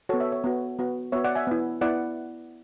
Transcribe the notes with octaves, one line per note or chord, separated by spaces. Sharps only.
B3 F#4 A4 C#5
C#5 E5
C#5 E5
B3 F#4
B3 F#4
B3 F#4 C#5 E5
D5 F#5
E5 G#5
B3 E4
B3 E4 D5 F#5